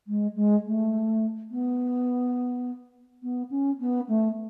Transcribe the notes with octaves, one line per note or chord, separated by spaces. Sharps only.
G#3
G#3
A3
B3
B3
C#4
B3
A3